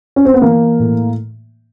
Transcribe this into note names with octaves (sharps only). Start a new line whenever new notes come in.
C#4
C4
B3
E3 A#3
A2